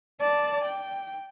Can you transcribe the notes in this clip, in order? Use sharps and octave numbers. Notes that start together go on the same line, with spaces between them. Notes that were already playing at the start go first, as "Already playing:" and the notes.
D5 A5
G5